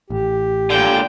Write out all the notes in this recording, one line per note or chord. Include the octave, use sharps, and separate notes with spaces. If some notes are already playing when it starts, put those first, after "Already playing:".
A1 G4
A#2 D3 G5